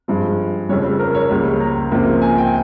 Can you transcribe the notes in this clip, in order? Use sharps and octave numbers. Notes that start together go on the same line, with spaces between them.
G2 F3 G#3
F1 F2 C#3 G3 C#5
A#4
C#5
C#2 C#3 G3 A#3
A#5
C#2 C3 F3 A#3
G#5
G5